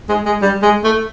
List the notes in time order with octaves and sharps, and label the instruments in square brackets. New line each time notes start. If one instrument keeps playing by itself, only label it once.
[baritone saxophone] G#3
G#3
G3
G#3
A3